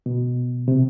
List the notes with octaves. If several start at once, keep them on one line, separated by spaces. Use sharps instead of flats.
B2
C3